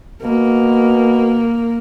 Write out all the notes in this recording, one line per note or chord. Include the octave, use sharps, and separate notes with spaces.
B2 A#3